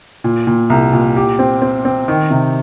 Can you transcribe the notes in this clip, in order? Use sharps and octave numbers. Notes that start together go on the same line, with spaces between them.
A#2
A#2
C2
A#2
G4
C4
C4
C4
D#3
C3